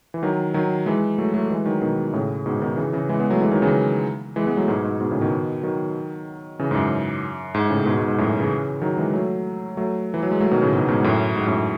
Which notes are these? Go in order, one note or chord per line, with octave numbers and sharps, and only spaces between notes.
E3
D#3 F#3
D#3 F#3
E3 G#3
F#3 A3
F#3 A3
E3 G#3
D#3 F#3
B2 D#3
A2 C#3
G#2 B2
B2 D#3
C#3 E3
C#3 E3
E3 G#3
G#3 B3
F#3 A3
E3 G#3
D#3 F#3
C#3 E3
E3 G#3
G#3 B3
F#3 A3
G#2 B2
G#2
G#2 B2
A2 C#3
B2 D#3
D#3 F#3
C#3 E3
G#2
F#2
G#2
A2 C#3
G#2 B2
G#2
G#2
F#2 A2
C#3 E3
D#3 F#3
E3 G#3
F#3 A3
F#3 A3
E3
F#3
G#3
F#3 A3
B2 D#3
A2 C#3
G#2 B2
G#2 B2
F#2 A2
G#2
F#2 A2